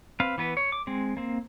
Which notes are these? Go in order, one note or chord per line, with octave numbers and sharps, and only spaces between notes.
C4 B4 F5
E3 B3 B4
C#5
D6
G#3 C4
A#3 C4